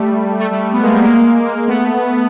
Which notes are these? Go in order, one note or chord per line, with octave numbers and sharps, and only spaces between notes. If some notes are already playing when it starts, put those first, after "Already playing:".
Already playing: G3 A3
G3 A3
G3 A3
G3 A3
A3 B3
G#3 A#3
G3 A3
G#3 A#3
A3 B3